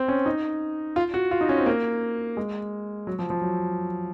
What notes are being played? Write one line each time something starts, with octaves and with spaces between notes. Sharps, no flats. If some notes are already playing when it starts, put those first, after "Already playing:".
Already playing: C4
C#4
D#4
F4
F#4
F4
D#4
C#4
C4
A#3
G#3
F#3
F3
F3
F#3